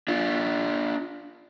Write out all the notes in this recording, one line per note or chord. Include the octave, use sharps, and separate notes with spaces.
D4 F4